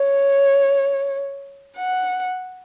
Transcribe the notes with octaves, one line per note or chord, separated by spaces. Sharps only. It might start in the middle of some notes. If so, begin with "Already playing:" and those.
Already playing: C#5
F#5